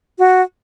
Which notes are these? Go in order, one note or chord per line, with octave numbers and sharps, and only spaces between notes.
F#4